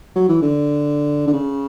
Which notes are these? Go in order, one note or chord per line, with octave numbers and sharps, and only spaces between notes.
F#3
E3
D3
D3
C#3